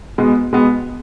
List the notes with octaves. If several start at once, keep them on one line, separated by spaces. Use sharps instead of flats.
B2 G#3 B3
B2 G#3 B3